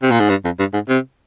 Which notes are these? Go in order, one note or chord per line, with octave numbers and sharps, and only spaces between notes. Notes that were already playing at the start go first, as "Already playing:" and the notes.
C3
A#2
G#2
G2
F2
G2
G#2
C3